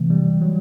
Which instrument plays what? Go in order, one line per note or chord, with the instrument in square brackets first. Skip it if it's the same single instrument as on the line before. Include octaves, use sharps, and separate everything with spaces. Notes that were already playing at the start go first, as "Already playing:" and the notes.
Already playing: [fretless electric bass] C3 E3 A3 C4
[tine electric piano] G3
F#3